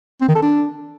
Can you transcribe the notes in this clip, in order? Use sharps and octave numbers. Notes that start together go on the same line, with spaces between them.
C4
D#3
A4
D4